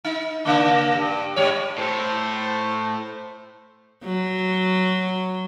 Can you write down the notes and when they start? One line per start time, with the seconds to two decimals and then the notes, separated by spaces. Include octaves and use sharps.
0.04 D#4
0.45 C#3 A#3 D4
0.95 G2
1.36 G#2 G3 C#5
1.78 A2 A4 C5
4.04 F#3